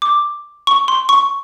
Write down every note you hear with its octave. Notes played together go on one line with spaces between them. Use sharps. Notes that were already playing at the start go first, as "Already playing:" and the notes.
D6
C#6
C6
C#6